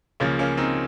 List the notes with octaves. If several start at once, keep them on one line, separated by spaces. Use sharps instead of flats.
C#2 C#3 F3 A#3 C#4
A#3 C#4
C4 D#4